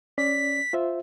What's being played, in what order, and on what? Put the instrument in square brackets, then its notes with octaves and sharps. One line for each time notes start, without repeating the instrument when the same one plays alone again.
[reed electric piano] C#4 D5 [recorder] B6
[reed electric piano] F4 C5 E5